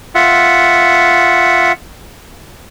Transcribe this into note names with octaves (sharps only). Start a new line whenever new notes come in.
F4 E5 F#5